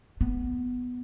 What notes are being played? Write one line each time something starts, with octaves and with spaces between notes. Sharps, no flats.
B3